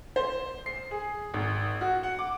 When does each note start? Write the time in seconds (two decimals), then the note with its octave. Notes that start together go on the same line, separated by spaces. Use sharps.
0.16 C5
0.66 C7
0.91 G#4
1.34 G#1
1.81 F#4
2.03 F#5
2.19 D6